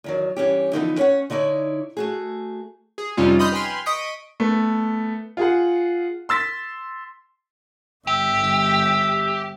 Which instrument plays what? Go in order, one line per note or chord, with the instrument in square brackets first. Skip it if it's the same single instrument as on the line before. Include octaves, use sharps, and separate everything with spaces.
[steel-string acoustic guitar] E2 D#3 F#3
G2 E3 C#4 G4
D3 E3 F3 B3 C4 D#4
C#4 C#5 F#5
D3 D#4 E4 C#5 D5
A3 F#4 G#4
[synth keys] G#4
F2 C3 G3 C#4 D#4 F4
D#5 B5 C6 D#6 F6 G6
B4 G5 G#5 B5 C6 F6
D#5 C#6 D#6 B6 D7
[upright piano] A3 B3
F4 G#4 F#5
C6 E6 A6 B6
[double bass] G1 [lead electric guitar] G4 [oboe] E5